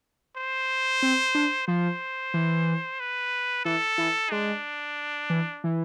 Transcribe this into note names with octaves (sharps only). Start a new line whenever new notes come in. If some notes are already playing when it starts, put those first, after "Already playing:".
C5
C4
D4
F3 C5
E3
B4
E3 A4
E3
G#3 D4
E3
E3